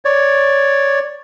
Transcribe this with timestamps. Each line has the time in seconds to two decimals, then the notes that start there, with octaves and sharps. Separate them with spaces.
0.05 C#5 D5